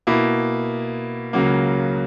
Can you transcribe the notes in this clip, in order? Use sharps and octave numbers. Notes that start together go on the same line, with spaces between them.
B2 A#3 E4
C#2 C#3 F#3 A#3